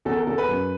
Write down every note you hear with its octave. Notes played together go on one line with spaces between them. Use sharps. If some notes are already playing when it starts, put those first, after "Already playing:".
E2 A4
A#4
E2 A4
B4
F#2